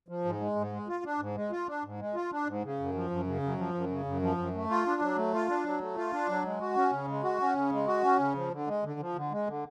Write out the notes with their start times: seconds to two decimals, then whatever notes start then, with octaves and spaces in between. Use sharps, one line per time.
0.09 F3
0.25 G#2
0.40 G#3
0.56 G#2
0.72 G#3
0.88 F4
1.05 D4
1.20 G#2
1.35 G#3
1.51 F4
1.67 D4
1.84 G#2
1.99 G#3
2.15 F4
2.32 D4
2.47 G#2
2.63 C#3
2.80 F#2
2.94 F3
3.10 F#2
3.27 C#3
3.43 F#2
3.58 F3
3.74 F#2
3.91 C#3
4.06 F#2
4.22 F3
4.38 F#2
4.54 A3
4.70 F4
4.86 D4
5.02 F#3
5.17 A3
5.34 F4
5.49 D4
5.65 F#3
5.81 A3
5.97 F4
6.13 D4
6.28 F#3
6.45 G#3
6.61 F#4
6.76 C#4
6.92 C#3
7.08 G#3
7.24 F#4
7.40 C#4
7.55 C#3
7.72 G#3
7.87 F#4
8.03 C#4
8.19 C#3
8.35 F3
8.52 D3
8.67 G#3
8.84 D3
9.00 F3
9.16 D3
9.31 G#3
9.47 D3